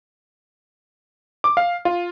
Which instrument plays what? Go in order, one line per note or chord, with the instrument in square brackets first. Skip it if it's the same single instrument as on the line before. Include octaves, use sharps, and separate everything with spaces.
[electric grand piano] D6
F5
F4